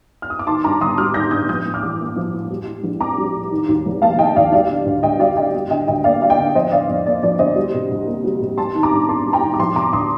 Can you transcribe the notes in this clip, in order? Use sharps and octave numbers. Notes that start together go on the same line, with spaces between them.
F6
D#6
D6
D#3 A5 C6
G2 A#5 D6
G1 C6 D#6
G3 D6 F6
D#3 G6 A#6
G2 D#6 G6
F3 D#6 G6
A2
D6 F6
A1
A#3
F3
A2
G3
A2
A#1
C4 A#5 D6
G3
A2
D#3
D#2
F1
A#3 F5 A5
D#3 D#5 G5
D#2 D5 F5
G3 D5 F5
D3
D2
D2 D#5 G5
G3 D5 F5
D3 D#5 G5
G3
D3 D#5 G5
D2 D#5 G5
A#3 D5 F5
G3 F5
D#5 G5
D3
F3 C5 D#5
D3 D5 F5
F2
A#3 D5
F3 D5
D3 C5 D#5
G3
C3
C2
A#3
G3
C3
G3 A5 C6
D#3
A#5 D6
G2
C4 A5 C6
G3
G5 A#5
D#3
D6
F3 A5 C6
C3 A#5 D6
D2 C6 D#6